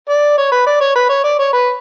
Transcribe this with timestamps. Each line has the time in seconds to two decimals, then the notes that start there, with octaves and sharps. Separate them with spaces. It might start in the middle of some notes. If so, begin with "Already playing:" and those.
0.09 D5
0.38 C#5
0.52 B4
0.67 D5
0.81 C#5
0.96 B4
1.09 C#5
1.24 D5
1.39 C#5
1.53 B4